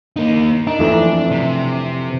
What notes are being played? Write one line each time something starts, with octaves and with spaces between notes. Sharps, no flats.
A#3 D#4
D4 D#4
F2 E3 A3
C3